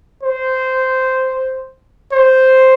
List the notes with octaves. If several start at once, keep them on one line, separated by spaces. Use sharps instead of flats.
C5
C5